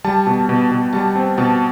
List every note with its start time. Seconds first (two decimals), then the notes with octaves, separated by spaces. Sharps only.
0.04 G3 A5
0.27 B2
0.49 B2
0.71 B2
0.93 G3 A5
1.15 C4
1.38 B2 A5